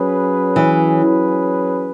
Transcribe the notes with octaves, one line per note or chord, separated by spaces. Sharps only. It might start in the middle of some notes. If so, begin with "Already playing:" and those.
Already playing: F#3 C#4 G#4 B4
E3